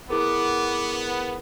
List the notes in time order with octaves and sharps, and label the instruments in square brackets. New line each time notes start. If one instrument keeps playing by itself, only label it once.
[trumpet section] B3 [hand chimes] E4 G#4 A#4 [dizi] D6